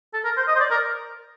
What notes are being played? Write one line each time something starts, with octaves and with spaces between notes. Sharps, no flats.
A4
A#4
C5
D#5
C5
D5
A#4